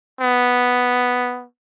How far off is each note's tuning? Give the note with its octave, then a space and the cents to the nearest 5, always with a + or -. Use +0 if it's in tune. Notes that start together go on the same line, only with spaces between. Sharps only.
B3 +0